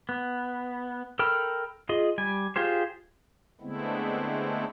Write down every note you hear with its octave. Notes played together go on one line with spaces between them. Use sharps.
B3
A4 A#4 G5 B5 F6
F4 G#4 D#5
G3 G#5
F4 G4 G#4 C5
D3 G#3 A3 B3 C4 E4